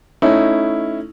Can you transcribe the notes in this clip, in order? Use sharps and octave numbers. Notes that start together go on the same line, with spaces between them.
A3 C#4 D#4 E4